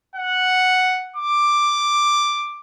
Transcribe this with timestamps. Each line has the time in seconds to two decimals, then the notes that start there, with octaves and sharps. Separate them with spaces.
0.16 F#5
1.16 D6